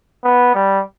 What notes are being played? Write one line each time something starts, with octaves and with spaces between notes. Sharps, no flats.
B3
G3